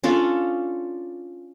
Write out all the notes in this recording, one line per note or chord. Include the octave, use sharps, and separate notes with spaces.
C#4 D4 F4 A4